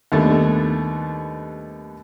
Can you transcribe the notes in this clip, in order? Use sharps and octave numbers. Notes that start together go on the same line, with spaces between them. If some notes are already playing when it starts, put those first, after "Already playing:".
D#2 G3 A3 B3 D4